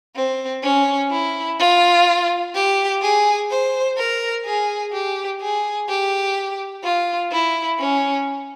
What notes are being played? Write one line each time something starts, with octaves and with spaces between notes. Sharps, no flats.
C4
C#4
E4
F4
G4
G#4
C5
A#4
G#4
G4
G#4
G4
F4
E4
C#4